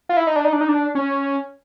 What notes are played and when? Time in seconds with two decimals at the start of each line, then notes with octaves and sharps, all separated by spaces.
0.09 F4
0.17 E4
0.27 D#4
0.36 D4
0.45 D#4
0.53 D4
0.61 D#4
0.69 D4
0.95 C#4